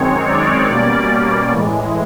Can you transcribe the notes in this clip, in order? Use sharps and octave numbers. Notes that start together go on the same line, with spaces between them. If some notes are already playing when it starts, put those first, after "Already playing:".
Already playing: F#2 D#3 G#3 C4 C#5
D5
B2 G3 A#3 C#4
A2 E3 G#3